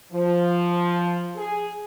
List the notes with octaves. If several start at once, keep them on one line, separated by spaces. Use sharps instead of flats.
F3
G#4